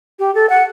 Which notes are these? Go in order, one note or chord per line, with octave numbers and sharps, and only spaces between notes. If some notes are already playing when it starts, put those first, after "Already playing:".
G4
A4
F#5